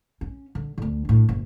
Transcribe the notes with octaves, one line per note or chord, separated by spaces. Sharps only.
C#4
D3
D2 D3
A2 D4
F#1